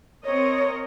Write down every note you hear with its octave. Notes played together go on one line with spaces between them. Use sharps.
C4 A#4 C#5 D#5